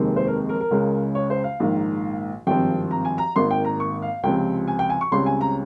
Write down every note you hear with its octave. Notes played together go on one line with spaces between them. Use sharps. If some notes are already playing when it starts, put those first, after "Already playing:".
Already playing: F1 D#2 D#3 G#3 C4
C5
A#4
A#4
A#4
C#2 C#3 G#3
C#5
C5
F5
A#1 G#2 D#3 A#3
G#1 G2 F3 C4 G5
A#5
G#5
A#5
G#1 G#2 D#3 A#3 C6
G5
A#5
C#6
F5
C#2 C3 F3 C4 G5
G#5
G5
G#5
C#6
C#2 C#3 G3 C4 C6
G#5
A#5